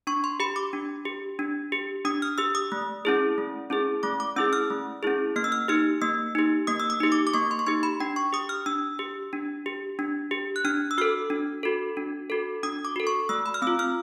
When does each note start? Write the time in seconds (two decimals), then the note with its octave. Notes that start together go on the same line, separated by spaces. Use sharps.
0.07 D4 C#6
0.24 C6
0.40 G4 B5
0.56 D6
0.73 D4
1.05 G4
1.39 D4
1.72 G4
2.05 D4 D#6
2.22 F6
2.38 G4 E6
2.55 D#6
2.72 A3
3.05 C#4 E4 G#4
3.38 A3
3.70 C#4 E4 G#4
4.03 A3 D6
4.20 D6
4.36 C#4 E4 G#4 E6
4.53 F6
4.70 A3
5.03 C#4 E4 G#4
5.36 A#3 F6
5.44 E6
5.52 F6
5.68 D#4 G4 F6
6.02 A#3 E6
6.35 D#4 G4
6.67 A#3 D#6
6.80 E6
6.90 D#6
7.00 D#4 G4
7.12 D6
7.27 D6
7.34 A#3 C#6
7.51 C6
7.59 C#6
7.66 D#4 G4 C6
7.83 B5
8.00 D4 G5
8.16 C#6
8.33 G4 D#6
8.49 F6
8.66 D4 E6
8.99 G4
9.33 D4
9.66 G4
9.99 D4
10.31 G4
10.56 F#6
10.65 D4 F6
10.91 E6
10.98 F#4 A4 F6
11.30 D4
11.63 F#4 A4
11.97 D4
12.30 F#4 A4
12.63 D4 D#6
12.85 D6
12.96 F#4 A4
13.07 C#6
13.29 A3 E6
13.46 B5
13.54 F6
13.62 C4 E6
13.67 F4
13.79 F6